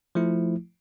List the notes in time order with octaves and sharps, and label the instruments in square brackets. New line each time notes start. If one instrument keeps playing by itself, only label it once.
[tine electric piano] F3 A3 E4